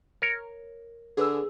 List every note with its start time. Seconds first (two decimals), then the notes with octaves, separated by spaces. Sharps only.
0.22 A#4 C#5
1.17 D3 G#4 B4 E6